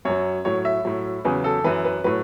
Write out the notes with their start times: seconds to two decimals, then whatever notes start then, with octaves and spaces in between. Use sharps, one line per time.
0.05 F#2 F#3 C#5
0.45 A2 F#3 C#5
0.65 E5
0.85 A2 F#3
1.25 E2 C#3 F#3 B4
1.44 A4
1.64 F#2 E3 B4
1.85 B4
2.04 A2 F#3 B4